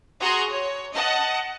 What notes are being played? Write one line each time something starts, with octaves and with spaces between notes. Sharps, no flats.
F#4 G#4 A#5 C6 C#6 D#6
C#5
D#5 F#5 A5